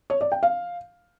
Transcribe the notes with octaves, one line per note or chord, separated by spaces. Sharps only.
C#5
D5
G5
F5